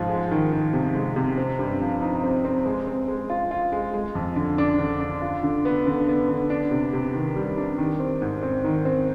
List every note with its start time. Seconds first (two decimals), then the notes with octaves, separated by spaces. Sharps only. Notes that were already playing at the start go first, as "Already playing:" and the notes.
Already playing: G#2 F3
0.09 G#3
0.31 D#3
0.53 D#3
0.73 C3
0.95 G#3
1.16 C3
1.38 C4
1.59 G2
1.81 F3
2.01 D#4
2.23 C4
2.45 C4
2.66 G#3
2.87 C4
3.08 G#3
3.30 F4
3.51 F4
3.72 G#3
3.94 G#3
4.15 F2
4.36 D3
4.58 D4
4.79 D3
5.00 D4
5.22 F4
5.43 D3
5.65 B3
5.87 D3
6.08 B3
6.29 D3
6.50 D4
6.71 C3
6.93 C3
7.14 D#3
7.36 G3
7.57 D4
7.78 D#3
8.00 C4
8.22 G#2
8.43 C4
8.64 D#3
8.85 C4